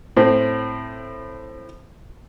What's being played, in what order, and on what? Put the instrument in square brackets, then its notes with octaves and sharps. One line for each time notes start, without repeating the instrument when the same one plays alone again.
[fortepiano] A2 C4